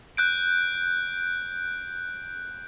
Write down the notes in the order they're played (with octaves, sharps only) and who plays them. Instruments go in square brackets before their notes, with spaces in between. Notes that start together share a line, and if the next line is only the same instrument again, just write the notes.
[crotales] F#6 G6 D7